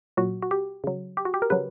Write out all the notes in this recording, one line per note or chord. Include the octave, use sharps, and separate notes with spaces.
A#2 F#3 F#4
F#4
G4
C#3 F#3
G4
F#4
G4
A#4
C#3 F#3 B4